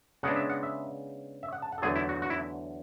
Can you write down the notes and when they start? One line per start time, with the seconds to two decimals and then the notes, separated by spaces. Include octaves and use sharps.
0.23 C#3 G#3 B3 D4 F#5
0.36 E5
0.50 F#5
0.63 E5
1.43 E5
1.53 F#5
1.62 A5
1.72 F#5
1.78 A4
1.82 E2 D3 F#3 A3 G#4
1.96 E4
2.09 F#4
2.22 F#4
2.30 E4